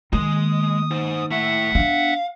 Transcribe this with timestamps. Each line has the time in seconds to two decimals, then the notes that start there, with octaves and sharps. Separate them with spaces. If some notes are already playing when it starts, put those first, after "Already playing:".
0.13 D#3 G#3 A#3 D#6
0.91 D#4 C5
1.31 A3 E4 E5 F#5
1.75 B3 D4 F5